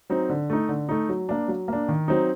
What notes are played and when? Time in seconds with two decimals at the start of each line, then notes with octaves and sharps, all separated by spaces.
0.10 F#3 C4 D#4
0.29 D3
0.50 A3 D#4
0.69 D3
0.89 A3 D#4
1.09 F#3
1.29 A#3 D4
1.48 F#3
1.68 A#3 D4
1.88 D#3
2.08 F#3 C4 D#4